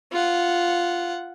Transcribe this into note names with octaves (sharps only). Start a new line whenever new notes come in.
F4 F#5